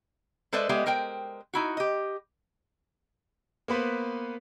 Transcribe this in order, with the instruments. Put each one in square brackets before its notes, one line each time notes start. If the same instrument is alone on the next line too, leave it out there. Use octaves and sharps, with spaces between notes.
[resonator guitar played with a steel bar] G#3 A4 B4 C5 D5 E5
G#3 B3 G4 E5
G#3 A#4 C5 G5
D#4 E4 F#4
G4 D#5
[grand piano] A#3 B3 B4 C5